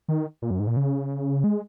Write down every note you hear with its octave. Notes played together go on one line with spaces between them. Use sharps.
D#3
A#2
F#2
G#2
A#2
C#3
G#3